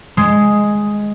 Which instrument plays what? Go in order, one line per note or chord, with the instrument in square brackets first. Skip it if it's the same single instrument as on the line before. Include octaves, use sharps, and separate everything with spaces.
[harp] G#3